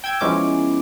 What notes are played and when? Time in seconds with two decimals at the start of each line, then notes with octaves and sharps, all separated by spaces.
0.04 G5 E6 G#6
0.21 F3 G#3 B3 C#4 E4 D6